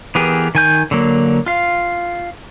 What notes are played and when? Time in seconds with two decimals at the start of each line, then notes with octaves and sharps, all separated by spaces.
0.15 E3 B3 G4 G#4 A#4
0.55 D#3 G#5 G6
0.91 D3 F#3 A#3
1.46 F4 F5